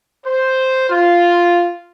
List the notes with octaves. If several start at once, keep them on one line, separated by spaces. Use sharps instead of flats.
C5
F4